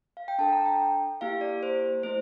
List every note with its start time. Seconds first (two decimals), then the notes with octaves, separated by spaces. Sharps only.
0.17 F5
0.28 G5
0.39 D4 A4 A5
0.52 A#5
0.65 G5
1.21 A#3 E4 G4 F5
1.41 D5
1.63 C5
2.03 A3 E4 C5